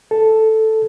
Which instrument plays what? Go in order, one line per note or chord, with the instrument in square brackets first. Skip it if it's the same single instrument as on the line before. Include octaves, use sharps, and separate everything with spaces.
[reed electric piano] A4